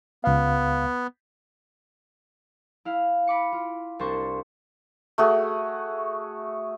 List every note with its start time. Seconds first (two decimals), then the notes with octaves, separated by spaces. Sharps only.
0.24 C#2 B3 F5
2.85 E4 F5
3.27 B5 D6 C#7
3.52 F4
3.99 C2 D4 C5 C#6
5.18 A3 F#4 G#4